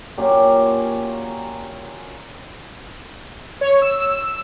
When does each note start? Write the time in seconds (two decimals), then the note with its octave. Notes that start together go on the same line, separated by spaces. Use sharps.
0.18 A#2 F#3 C#4 G4
3.61 C#5
3.82 E6